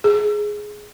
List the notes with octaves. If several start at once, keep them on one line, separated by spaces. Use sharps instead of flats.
G#4